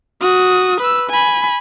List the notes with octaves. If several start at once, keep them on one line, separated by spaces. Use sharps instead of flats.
F#4 D#6
B4 E6
G#5 B5